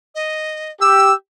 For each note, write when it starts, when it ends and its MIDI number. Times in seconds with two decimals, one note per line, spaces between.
0.15 0.71 75
0.81 1.12 67
0.81 1.12 88